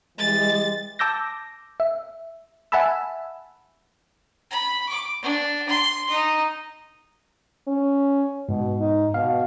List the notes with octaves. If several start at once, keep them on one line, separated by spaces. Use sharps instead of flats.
E3 G3 G#3 A6
A5 D6 E6 G6 A#6
E5
E5 F#5 G#5 A5 B5 E6
B5
D6
D4
C6
D#4
C#4
G#2 B2
D#4
B2 F5